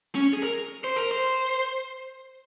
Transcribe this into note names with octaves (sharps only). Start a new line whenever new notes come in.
C#4
G#4
A#4
C5
A#4
C5